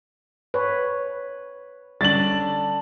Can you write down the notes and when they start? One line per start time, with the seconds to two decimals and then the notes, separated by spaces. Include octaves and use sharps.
0.54 B4 C#5
2.01 D3 G3 C#4 D4 A6 F#7